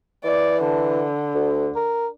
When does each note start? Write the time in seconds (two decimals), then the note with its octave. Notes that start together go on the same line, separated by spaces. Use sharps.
0.25 E3 D5
0.64 D3
1.35 D2
1.76 A#4